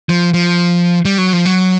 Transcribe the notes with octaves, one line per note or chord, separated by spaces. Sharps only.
F3
F3
G3
F#3
F3
F#3